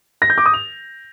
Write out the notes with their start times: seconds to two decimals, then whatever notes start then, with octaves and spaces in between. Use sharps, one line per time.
0.22 A#6
0.30 G6
0.38 D6
0.46 D#6
0.53 F7